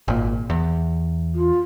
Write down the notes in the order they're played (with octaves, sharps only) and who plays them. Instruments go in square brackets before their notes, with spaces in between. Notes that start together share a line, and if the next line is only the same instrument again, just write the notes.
[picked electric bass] G#1 A#2
E2
[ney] F4